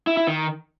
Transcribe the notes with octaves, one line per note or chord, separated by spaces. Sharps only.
E4
E4
D#3